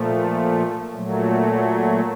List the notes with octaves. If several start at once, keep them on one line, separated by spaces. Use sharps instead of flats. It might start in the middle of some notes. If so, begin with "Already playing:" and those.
Already playing: A#2 F3 A3
A#2 F#3 A3